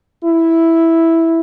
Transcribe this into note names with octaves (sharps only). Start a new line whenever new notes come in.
E4